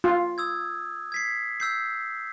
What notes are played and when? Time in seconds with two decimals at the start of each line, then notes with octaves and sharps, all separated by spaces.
0.04 F4
0.38 D#6 E6 G#6
1.12 G#6 B6 C7
1.60 E6 G6 C7